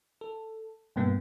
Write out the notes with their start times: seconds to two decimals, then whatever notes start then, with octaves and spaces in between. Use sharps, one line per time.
0.21 A4
0.96 G2 B2 A#3 B3